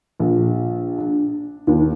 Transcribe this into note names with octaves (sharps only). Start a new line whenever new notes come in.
A#1
D4
D#2